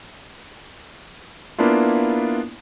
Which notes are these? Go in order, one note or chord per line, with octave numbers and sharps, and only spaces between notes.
A#3 B3 D4 E4 F4